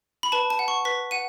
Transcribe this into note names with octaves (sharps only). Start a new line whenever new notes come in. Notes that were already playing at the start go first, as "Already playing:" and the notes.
B5
B4 A5
A5
F#5
C#6
B4 B6
F#5 D#7